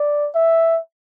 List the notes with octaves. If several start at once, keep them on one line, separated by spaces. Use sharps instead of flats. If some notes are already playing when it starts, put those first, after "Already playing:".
Already playing: D5
E5